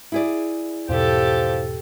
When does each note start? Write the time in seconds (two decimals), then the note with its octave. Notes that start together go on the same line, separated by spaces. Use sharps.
0.12 E4 G#4 D5
0.89 E2 G#2 B2 F3 G4 A4